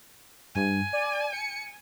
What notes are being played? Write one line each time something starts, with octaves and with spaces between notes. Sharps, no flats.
G2 G#5
D5
C#7